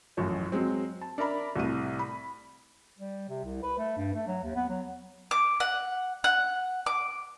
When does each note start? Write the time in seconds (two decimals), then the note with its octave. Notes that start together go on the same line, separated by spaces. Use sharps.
0.17 A1 F#2 A2 F3 C#5
0.52 F#3 G#3 C4
1.01 A5
1.18 D4 A#4 E5 A#5 B5
1.56 C2 A2 C3 D#7
1.99 B5
2.99 G3
3.29 C3
3.44 C2
3.63 B4
3.78 A3
3.97 G2
4.14 A3
4.27 F#3
4.43 D#2
4.55 B3
4.69 F#3
5.31 D6
5.60 F#5
6.24 F#5
6.86 D6